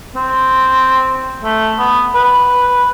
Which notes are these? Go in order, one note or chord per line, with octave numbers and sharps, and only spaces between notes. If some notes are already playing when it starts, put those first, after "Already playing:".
C4
A3
B3
B4